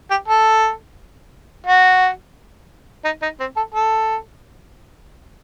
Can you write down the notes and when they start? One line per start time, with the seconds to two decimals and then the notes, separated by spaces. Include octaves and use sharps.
0.11 G4
0.28 A4
1.66 F#4
3.05 D#4
3.22 D#4
3.40 C4
3.57 A4
3.74 A4